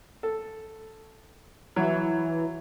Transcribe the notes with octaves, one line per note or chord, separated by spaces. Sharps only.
A4
E3 F#3